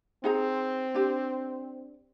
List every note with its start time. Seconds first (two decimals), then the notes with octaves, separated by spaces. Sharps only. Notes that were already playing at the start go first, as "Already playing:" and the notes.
0.24 C4 D#4 G#4 A#5
0.94 D4 G4